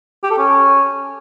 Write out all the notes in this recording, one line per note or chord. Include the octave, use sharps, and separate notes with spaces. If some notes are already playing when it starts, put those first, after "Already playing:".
G4
A4
C#4